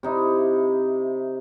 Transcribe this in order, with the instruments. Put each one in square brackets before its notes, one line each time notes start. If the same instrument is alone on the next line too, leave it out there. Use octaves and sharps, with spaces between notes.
[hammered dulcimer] C3 D#4 E4